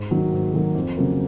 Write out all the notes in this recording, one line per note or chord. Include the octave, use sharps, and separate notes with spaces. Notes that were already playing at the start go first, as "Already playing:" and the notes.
Already playing: G#2
D#3 F#3 A#3
G#2
D#3 F#3 A#3
F2
C#3 F#3 A#3